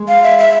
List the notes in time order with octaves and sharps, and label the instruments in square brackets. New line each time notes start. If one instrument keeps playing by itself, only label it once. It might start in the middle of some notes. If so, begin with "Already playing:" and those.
Already playing: [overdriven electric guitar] G#3
[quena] F5
E5
E5